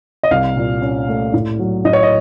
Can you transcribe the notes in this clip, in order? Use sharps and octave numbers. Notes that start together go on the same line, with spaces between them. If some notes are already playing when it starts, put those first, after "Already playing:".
D#5
C2 F5
A#2
C#4
A3
A2
F#3
A2 D#5
C#5
D#5